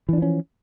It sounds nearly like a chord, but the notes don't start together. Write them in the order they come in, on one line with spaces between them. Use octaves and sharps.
E3 D4 F3 C#4